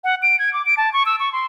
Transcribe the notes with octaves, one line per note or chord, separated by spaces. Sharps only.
F#5
D7
G#6
D6
D7
A5
C#6
E6
C#6
C6